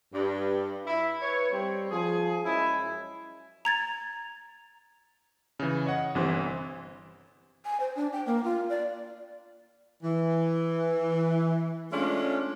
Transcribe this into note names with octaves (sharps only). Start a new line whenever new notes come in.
G2
E4
B4 C#5
G3 C4
F3 G#4
F#2 G#3 C#4 E4
A#5 G#6 A6
C#3 E3
C#5 D#5 F#5
G1 C3 E3 C5
G#5
C5
D4
G5
A#3
F4
D5
E3
G#3 A3 C#4 D4 F4